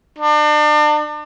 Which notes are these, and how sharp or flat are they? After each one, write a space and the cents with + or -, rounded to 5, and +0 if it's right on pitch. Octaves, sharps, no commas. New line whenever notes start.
D4 +35